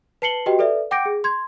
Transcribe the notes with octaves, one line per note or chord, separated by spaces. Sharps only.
B4 A5 C7 C#7 F#7 G7
F#4 G4 B4 D#5 G5
A4 B4 D5 E5
F#5 G5 D6 G6 A#6 D7
G#4
C6 G#6